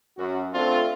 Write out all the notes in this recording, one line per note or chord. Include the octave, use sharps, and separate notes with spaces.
F#2 F#4
A3 C4 D4 F4